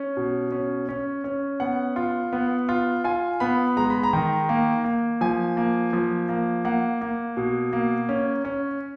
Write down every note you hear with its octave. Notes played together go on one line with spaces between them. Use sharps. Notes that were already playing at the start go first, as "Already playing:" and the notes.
Already playing: C#4
B2
C#4
C#4
C#4
B3 F#5
F4
B3
F4
F4 G#5
B3 B5
G#3 A#5
B5
A#5
D#3
A#3
A#3
F3 G#5
A#3
F3
A#3
A#3 F#5
A#3
B2
A#3
C#4
C#4